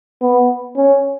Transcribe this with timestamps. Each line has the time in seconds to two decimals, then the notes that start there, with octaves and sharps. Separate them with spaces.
0.22 B3
0.77 C#4